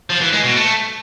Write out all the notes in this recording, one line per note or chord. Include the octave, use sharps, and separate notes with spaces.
F3
E3
G#3
B2
A3